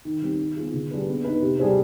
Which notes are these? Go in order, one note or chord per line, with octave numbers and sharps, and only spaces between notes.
D#3
G3 C4
D#3
B3 F4 G#4
D3
G3 D4 G#4 B4
B3
D#4 B4
C3
G3 D4 G#4 C5